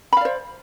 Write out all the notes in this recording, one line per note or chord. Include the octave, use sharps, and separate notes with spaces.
C5 D5 F5 B5